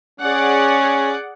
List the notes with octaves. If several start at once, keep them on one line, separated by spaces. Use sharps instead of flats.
C#4 G#4 D5 F#5